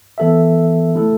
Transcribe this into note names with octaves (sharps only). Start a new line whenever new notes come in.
E3 B3 A4 E5
C#3 A3 E4 A4